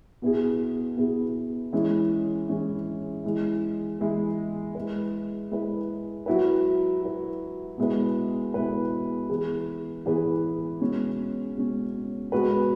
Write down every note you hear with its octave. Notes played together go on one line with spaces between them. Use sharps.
B2 B3 E4 G#4
B2 B3 E4 G#4
E3 G#3 C#4 E4
E3 G#3 C#4 E4
E3 G#3 E4
E3 G#3 E4
G#3 E4 B4
G#3 E4 B4
F#3 E4 B4
F#3 E4 B4
B2 G#3 E4 B4
B2 G#3 E4 B4
E3 B3 G#4 B4
E3 B3 G#4 B4
B2 G#3 C#4
B2 G#3 C#4
B2 G#3 B3 F#4 B4